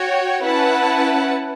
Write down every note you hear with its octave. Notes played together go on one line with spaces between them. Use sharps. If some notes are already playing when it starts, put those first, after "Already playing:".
Already playing: F#4 C#5 G5
C#4 E4 B4 F#5 A5